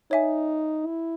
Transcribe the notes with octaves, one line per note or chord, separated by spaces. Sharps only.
D#4 C#5 E5 G#5
E4